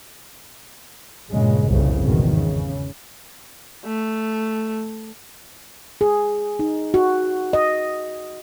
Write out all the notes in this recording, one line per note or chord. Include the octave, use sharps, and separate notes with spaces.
G2 A#2 C#3 G#3
G1 C2 F2 C#3
G#1 E2 B2 D#3
C#3
A3
G#4
D#4
F#4
D#5